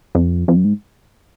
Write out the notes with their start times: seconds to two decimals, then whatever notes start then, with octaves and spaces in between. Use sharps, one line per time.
0.15 F2
0.48 F2
0.56 F#2
0.65 G#2